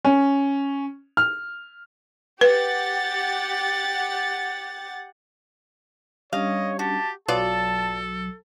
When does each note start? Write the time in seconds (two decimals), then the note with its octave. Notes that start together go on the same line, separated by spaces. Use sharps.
0.05 C#4
1.17 F6
2.41 G4 B4 F#5 A6
6.33 G3 C#4 D4 C#5 D#5 F5
6.79 F#4 G4 A5
7.28 B1 F#3 B3 F4 A4 D5 A5